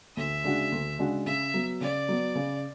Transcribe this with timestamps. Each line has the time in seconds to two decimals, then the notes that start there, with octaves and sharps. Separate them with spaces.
0.17 D2 E5
0.44 C#3 G#3 D4 F#4
0.72 D2
0.99 C#3 G#3 D4 F#4
1.26 C#3 E5
1.54 F#3 B3
1.81 C#3 D5
2.08 F#3 B3
2.35 C#3